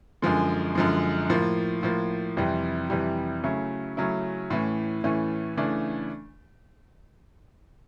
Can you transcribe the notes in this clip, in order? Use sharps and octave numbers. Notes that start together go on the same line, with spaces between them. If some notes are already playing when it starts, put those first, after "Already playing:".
F#2 D3 F3 G#3
F#2 D3 F3 G#3
A2 F3 A#3
A2 F3 A#3
F2 C3 E3 G3
F2 C3 E3 G3
C#3 F#3 A3 C#4 E4
C#3 F#3 A3 C#4 E4
A2 E3 A3 C#4
A2 E3 A3 C#4
C#3 E3 A3 D4